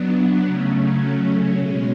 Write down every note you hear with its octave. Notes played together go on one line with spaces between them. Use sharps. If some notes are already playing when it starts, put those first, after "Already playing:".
Already playing: F#3 B3 D4
C#3 F#3 A3 C#4
B2 G#3 C#4